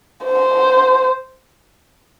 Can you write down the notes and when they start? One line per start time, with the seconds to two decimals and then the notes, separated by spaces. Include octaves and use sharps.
0.25 C5